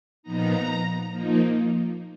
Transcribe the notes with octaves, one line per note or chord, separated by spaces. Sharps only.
A#2 F3 B3 D#4 A#5
F3 A#3 D#4